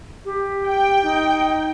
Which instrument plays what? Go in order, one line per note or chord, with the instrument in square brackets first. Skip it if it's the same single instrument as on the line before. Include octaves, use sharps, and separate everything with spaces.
[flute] G4
[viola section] G5
[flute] D#4